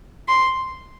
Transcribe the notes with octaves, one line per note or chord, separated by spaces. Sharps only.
C6